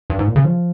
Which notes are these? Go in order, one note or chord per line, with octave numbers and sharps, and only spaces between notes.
G2
G#2
A#2
C#3
F3